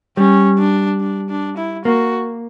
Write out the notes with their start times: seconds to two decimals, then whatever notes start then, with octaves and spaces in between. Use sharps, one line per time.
0.17 G3 C#4
0.59 D4
1.01 D4
1.30 D4
1.57 E4
1.85 A#3 F#4